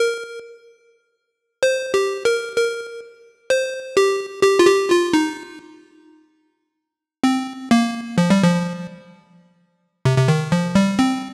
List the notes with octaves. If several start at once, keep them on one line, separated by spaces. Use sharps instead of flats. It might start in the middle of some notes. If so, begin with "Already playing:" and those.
Already playing: A#4
C5
G4
A#4
A#4
C5
G4
G4
F4
G4
F4
D#4
C4
A#3
F3
G3
F3
C3
C3
D#3
F3
G3
C4